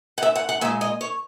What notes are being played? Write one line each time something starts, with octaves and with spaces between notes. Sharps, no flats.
F#5
E5
F#5
F#5
A#2 G#3 E5
D#5
C#5